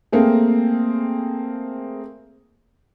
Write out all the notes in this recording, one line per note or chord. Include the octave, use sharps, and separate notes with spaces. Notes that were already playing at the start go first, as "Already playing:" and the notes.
A3 A#3 C4 G#4